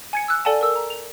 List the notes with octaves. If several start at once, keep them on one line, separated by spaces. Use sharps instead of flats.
G#5 G#6 C#7
E6 F#6
A4 D5 F#5 G#5 A5
A#4 E6
A#5
F7